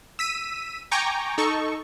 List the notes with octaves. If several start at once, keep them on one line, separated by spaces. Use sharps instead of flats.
E6 B6 D#7
G5 G#5 A#5 C#6 D6
D#4 A4 C#6